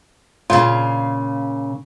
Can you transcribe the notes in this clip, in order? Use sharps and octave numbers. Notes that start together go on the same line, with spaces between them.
A#2 C#3 F4